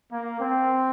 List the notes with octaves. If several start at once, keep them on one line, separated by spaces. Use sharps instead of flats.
A#3
C4